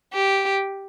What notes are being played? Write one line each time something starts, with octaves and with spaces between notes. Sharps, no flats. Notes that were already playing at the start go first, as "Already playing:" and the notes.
G4